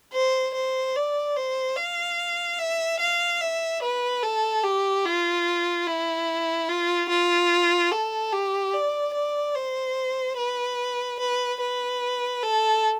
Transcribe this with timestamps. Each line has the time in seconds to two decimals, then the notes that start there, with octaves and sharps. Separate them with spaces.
0.13 C5
0.54 C5
0.95 D5
1.36 C5
1.76 F5
2.59 E5
3.00 F5
3.41 E5
3.82 B4
4.23 A4
4.64 G4
5.05 F4
5.87 E4
6.69 F4
7.09 F4
7.91 A4
8.33 G4
8.74 D5
9.14 D5
9.55 C5
10.37 B4
11.20 B4
11.60 B4
12.43 A4